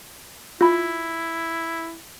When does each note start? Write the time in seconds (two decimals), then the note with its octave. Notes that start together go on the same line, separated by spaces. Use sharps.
0.61 E4 F4 B5